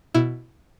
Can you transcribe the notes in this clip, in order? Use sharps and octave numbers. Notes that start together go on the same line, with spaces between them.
B2 E4